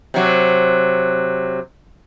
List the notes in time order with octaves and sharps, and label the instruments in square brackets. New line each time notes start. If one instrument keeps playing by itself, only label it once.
[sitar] C3 F#3